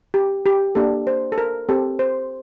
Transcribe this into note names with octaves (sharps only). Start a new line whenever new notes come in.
G4
G4
A#3 D4 G4 A4
C5
A4
A#4
C4 G4 A4
C5